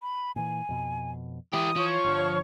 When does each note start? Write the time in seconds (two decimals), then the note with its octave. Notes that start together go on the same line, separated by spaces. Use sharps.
0.02 B5
0.36 A#2 E3 G#5
0.69 F2 B2
1.53 E3 E4 G4 D#6
1.76 F3 C#5 C#6
2.04 G1 D3 F6